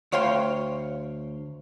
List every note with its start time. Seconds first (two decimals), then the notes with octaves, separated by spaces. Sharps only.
0.12 D2 C#5 F5 G5 C6